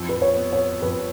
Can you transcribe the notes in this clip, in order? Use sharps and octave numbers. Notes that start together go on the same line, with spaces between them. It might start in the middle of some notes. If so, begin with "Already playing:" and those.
Already playing: F2
B4
C#5
B3
C#5
F2 B4